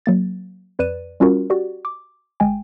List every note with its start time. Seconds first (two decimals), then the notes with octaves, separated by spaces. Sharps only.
0.06 F#3 A#3 A6
0.79 F2 B4 D5 F#6 D#7 E7
1.20 G3 C#4 F4 F#4 A#4
1.50 F#4 G4 D5
1.85 D6
2.40 G1 G#3 G5 G#5